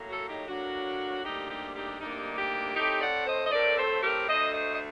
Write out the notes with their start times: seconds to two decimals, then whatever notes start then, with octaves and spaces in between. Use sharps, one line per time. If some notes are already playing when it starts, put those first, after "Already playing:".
Already playing: A2 F#3 A#3
0.09 F#4 A4
0.29 D#4 G4
0.48 A2 F#3 A#3 D4 F#4
1.24 D2 C3 G3 A#3 D4 D#4 G4
1.49 D#4 G4
1.75 D#4 G4
2.00 D2 C3 G3 A#3 D4 D#4
2.38 D#4 G4
2.75 A2 A3 C4 D#4 G4
3.01 D5 F#5
3.26 C5 D#5
3.45 D#5
3.52 A2 A3 C4 A#4 D5
3.77 A4 C5
4.03 G4 A#4
4.28 D2 D3 A3 C5 D#5
4.53 C5 D#5
4.73 D#5